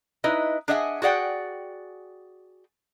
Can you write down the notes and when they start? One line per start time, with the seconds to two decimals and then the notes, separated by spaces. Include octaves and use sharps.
0.24 D#4 E4 B4 D#5
0.68 D4 G#4 D#5 E5 F#5 G#5
1.02 F#4 G#4 D5 F#5 G5